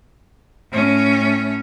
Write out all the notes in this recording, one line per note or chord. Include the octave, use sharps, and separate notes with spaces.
A2 C#4